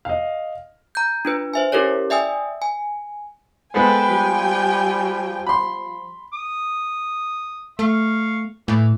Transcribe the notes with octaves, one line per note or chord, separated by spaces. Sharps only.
D#5 F5
A#5 G6
D4 F4 B4
C5 E5 G#5
C#4 E4 G4 A4 A#4 C#5
D5 E5 G5 G#5 D#6 E6
G#5
G#3 B3 A4 B4 C5 G5 G#5
F3 G3
B5 C6
D#6
A3 F5 C#6
A2 E3